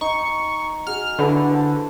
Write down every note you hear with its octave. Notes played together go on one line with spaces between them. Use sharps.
D#4 C#6
F#4 G#4 F6
D3 B3 E4 F#4
C5 A5